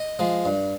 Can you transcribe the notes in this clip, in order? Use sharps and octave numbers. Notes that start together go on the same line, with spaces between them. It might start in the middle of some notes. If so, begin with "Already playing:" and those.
Already playing: D#5
F3 G#3
G2